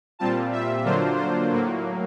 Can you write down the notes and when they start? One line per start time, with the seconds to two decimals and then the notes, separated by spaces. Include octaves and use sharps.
0.19 A#2 G3 C4 F4 A5
0.52 E5
0.85 D3 F#3 A#3 D4 F4 C5
1.17 C5
1.51 A2 F#3 A#3